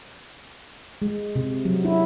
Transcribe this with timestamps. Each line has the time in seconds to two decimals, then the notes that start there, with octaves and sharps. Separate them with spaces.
1.02 G#3
1.36 C3
1.65 F#3
1.85 E4